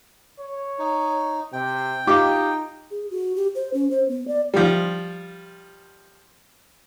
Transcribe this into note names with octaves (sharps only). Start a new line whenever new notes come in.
C#5
D#4
C3 G5
D#4 F4 G4 D6
G#4
F#4
G4
C5
C#4
C5
B3
D5
F3 G3